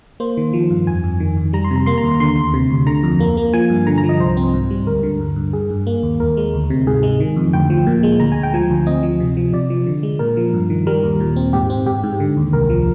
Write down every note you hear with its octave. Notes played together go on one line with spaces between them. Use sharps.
A#3 C5
D#3
F3
G2
F2 G#5
F2
D#3
F2
G3 A#5
C6
C3
A#5
A#3 C6
A#5
D#2
D3 C6
D2
C3
D2
D3 A#5
F2
A#3
A#3
F3 G#5
G2
D3 A#5
A#5
F3
D#5
C2 C5
C4
G#2
G3
D2 A#4
D3
G2
G2
G2 G#4
G2
A#3
D#2
D#2 A#4
G#3
D2
C3
G#2 G#4
G#3
D#3
F2
D2 G5
F3
A#2
G#3
D2 A#5
G#5
D2
G5
F3 G#5
D2
C4 D#5
F3
C3
F3
C3 D5
F3
D3
G#3
A#2 A#4
F3
G2
D#3
G3 A#4
D#2
A#2
C4
G#2 G4
C4
G#2 G4
G#2
D3
D#2
C2 A#4
F3